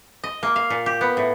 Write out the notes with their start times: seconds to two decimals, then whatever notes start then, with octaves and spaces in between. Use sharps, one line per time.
0.24 D#5
0.43 A#3
0.56 F5
0.70 A#2
0.86 G4
1.01 B3
1.17 A2